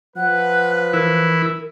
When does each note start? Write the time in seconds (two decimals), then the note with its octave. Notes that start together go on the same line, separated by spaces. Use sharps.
0.16 F3 B4 F#5 F#6
0.93 E3 E4 A#4